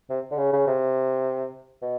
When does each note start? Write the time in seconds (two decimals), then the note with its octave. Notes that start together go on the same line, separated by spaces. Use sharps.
0.10 C3
0.31 D3
0.38 C#3
0.53 C#3
0.67 C3
1.82 B2